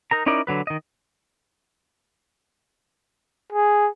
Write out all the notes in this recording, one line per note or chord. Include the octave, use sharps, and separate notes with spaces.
D#4 A#4 A#5
C#4 D#4 E4 A#4 D5
D3 F#3 B4
D#3 D#5
G#4